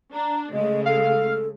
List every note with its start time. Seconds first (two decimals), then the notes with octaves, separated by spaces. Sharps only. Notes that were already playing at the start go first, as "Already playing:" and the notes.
0.14 D4 A#5
0.53 C#3 G#3 A3 D#5
0.86 A4 F5